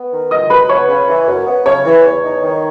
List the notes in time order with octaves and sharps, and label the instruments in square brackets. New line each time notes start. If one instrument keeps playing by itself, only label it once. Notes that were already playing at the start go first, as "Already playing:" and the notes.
Already playing: [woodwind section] B3
D#3
[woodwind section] G#3 [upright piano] D#5 D#6
[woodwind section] F#2 [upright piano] B4 B5
[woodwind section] B3 [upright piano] C#5 C#6
[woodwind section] C#3
E3
F#2
B3
[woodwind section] C#3 [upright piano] C#5 C#6
[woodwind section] E3
E2
D#4
D#3